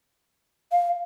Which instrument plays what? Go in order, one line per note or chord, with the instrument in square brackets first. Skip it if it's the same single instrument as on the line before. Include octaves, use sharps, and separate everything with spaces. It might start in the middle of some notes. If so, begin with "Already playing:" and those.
[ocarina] F5